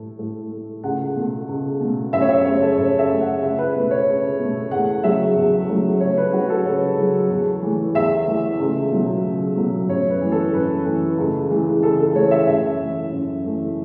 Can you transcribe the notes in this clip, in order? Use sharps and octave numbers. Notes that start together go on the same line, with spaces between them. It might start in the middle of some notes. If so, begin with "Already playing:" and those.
Already playing: A2 A3
A2
A3
C#2 F#5
B2 A3
C#2
B2 A3
F#2 E5
C#5
E5
C#3 A3 C#5
A4
F#2 C#5
E5
C#3 A3
F#5
C#2 E5
B4
B2 A3 B4
C#5
C#2
B2 A3
E2 F#5
C#3 F#3 A3 E5
E2
C#3 F#3 A3
C#2 C#5
B4
C#3 F#3 F#4
A4
C#2 C#5
C#3 F#3
E2
E3 A3
E2 E5
E3 A3
C#2
B2 F#3 A3
C#2
B2 F#3 A3
F#2 C#5
B4
E3 A3
A4
F#2 B4
E3 A3
C#2
C#3 E3 A3
C#2 A4
A4
C#3 E3 A3 C#5
E5
F#2 E5
E3 A3
F#2
E3 A3